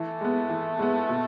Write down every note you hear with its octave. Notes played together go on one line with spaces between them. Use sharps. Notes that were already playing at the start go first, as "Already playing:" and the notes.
Already playing: E3 A3
G#3 B3
E3
G#3 B3
B2